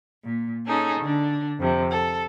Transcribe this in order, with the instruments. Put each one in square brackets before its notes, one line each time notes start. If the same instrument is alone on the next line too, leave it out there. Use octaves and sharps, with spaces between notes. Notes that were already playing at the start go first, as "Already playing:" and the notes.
[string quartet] A#2
C#4 D#4 G#4 A4
D3 D4
F2 C3
A4